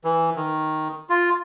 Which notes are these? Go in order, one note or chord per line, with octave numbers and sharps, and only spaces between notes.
E3
D#3
F4